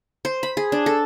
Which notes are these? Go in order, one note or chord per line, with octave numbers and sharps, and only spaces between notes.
C5
B5
G#4
D4
A4